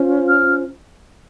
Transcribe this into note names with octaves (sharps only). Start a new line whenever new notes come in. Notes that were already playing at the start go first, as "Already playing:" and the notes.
Already playing: C#4 F4 C5
F6